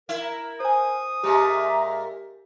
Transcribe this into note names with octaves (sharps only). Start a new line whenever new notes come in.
E4 A#4
C5 G#5 D#6
A#2 G#3 G4 E5 A#5